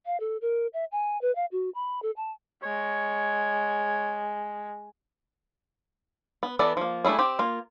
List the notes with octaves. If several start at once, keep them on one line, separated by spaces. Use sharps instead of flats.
F5
A4
A#4
E5
G#5
B4
F5
F#4
B5
A4
A5
G#3 C#5
B3
E3 B3 A4 D5
F3 A#3
G3 A3 D#4 E4 G#4
C4 G4
A#3 F4